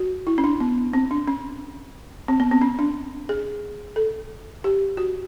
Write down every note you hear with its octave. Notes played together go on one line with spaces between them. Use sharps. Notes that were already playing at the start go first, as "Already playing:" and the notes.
Already playing: F#4
E4
C#4
D4
B3
C4
D4
C#4
C4
B3
C4
C#4
D4
G#4
A4
G4
F#4